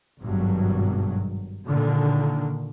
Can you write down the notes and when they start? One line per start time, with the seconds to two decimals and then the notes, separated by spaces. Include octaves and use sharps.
0.23 G#1 G2 B2 F#3
1.66 A#2 D3 D#3